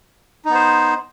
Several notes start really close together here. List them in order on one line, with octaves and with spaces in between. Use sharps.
D#4 B3 C5